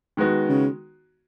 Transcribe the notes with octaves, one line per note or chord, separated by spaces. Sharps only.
D#3 G#3 B3 F#4
C#3